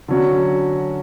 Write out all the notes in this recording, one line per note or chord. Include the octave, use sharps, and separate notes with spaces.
D3 F#3 C#4 F#4